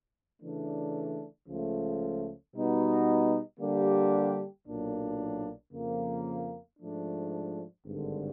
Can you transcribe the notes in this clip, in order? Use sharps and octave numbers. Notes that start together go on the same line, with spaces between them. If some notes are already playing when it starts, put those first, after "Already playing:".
C#3 E3 A3 D4
C#2 C#3 F3 A3
B2 G3 B3 D#4 F#4
D3 G3 A#3 D4 G4
B1 A#2 F#3 A#3 D4
F2 C#3 F3 A#3
G#2 F3 A3 D4
G#1 G2 D3